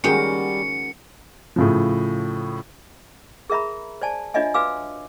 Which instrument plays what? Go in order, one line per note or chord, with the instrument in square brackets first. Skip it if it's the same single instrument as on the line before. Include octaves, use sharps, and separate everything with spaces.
[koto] D#3 G#3 G5 [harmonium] G3 [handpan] C#4 F#4 A#4 [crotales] C#7
[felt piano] A2 C#3 F3
[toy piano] G#4 A#4 E5 A#5 B5
C5 D5 G#5 A5
D4 F4 C#5 D#5 E5 G#5
F#4 B4 F5 G#5 D6 E6